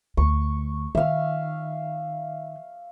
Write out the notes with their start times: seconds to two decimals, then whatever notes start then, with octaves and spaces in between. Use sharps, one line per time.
0.17 D2 C#6
0.95 D#3 E5 F5